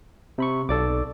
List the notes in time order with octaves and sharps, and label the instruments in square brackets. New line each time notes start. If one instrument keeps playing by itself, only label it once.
[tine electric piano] C3 B5 C#6
[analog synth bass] B1 [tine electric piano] A4 D5 D6